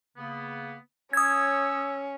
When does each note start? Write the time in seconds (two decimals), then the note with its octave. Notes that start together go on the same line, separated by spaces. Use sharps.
0.17 C#3 A#3 B3
1.13 C#4 C#5 D#6 E6 G#6